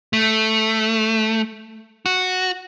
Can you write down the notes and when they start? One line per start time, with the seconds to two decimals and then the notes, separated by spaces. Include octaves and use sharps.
0.13 A3
2.06 F#4